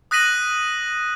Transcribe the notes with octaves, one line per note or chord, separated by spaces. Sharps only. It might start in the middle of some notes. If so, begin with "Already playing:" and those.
D#6 F#6 A#6 B6 D#7 F#7